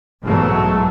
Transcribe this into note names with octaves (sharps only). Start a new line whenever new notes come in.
B1 G#2 B2 E3 F#3 A3